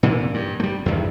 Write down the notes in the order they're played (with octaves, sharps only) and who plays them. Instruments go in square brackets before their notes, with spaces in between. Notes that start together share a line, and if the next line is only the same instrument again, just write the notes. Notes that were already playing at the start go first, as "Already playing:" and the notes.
[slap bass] A#2 D3 E3
G2
G3 A3
E2 G2 D#3